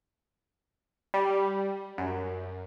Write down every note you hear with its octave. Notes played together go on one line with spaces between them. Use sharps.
G3
F#2